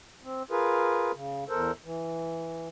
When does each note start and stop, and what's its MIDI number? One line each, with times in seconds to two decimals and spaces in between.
0.23 0.43 60
0.51 1.12 65
0.51 1.12 68
0.51 1.12 70
0.51 1.12 71
1.15 1.44 49
1.49 1.71 40
1.49 1.71 69
1.49 1.71 70
1.49 1.71 72
1.85 2.68 52